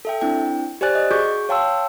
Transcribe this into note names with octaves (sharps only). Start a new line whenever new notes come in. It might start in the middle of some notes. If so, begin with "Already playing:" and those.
A4 E5 G5
C4 D4 E4 G5
G4 C5 D5 G#5 F#6 A6
D#5
F#4 G#4 C#6 D6 G6
C#5 F5 G5 A5 C6 E6